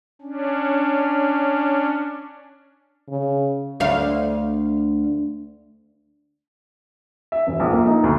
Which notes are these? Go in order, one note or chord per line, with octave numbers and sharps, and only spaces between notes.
C#4 D4
C#3
D2 F5
E5
E1
A#1
A#3
D#4
D2